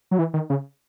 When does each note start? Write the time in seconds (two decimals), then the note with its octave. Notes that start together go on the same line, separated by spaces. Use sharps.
0.11 F#3
0.19 E3
0.34 D#3
0.50 C#3